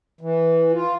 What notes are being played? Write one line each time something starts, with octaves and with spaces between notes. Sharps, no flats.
E3
F4